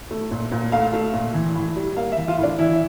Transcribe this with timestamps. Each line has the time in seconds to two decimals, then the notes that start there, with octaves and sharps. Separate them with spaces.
0.11 A3
0.31 A#2
0.52 A#2
0.72 A3 F5
0.93 A3
1.14 A#2
1.34 E3
1.55 A2
1.76 G3
1.96 A#3 F5
2.12 E5
2.17 E3
2.28 F4
2.37 A2
2.43 D4
2.58 E3 E4